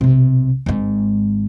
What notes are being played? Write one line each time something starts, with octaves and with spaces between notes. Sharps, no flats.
B1 C3
G#1 G#2